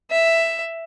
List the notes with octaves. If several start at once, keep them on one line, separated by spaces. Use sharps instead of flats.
E5